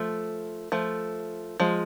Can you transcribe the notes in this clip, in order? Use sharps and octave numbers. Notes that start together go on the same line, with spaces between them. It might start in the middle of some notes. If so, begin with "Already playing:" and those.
Already playing: F3 A3
F3 A3
F3 G#3